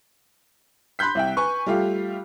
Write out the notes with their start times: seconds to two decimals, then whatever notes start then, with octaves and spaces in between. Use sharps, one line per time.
0.99 B5 C6 F#6 G6 B6
1.15 C2 E5 G5
1.37 B4 G#5 C#6
1.66 G3 A3 F4 G4 F5